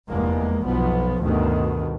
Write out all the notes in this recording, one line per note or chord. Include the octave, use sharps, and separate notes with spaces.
F1 E2 G2 G#3 A#3
B1 F3 B3
D2 G2 B2 D#3